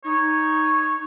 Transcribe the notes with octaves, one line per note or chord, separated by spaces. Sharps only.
D#4 C#5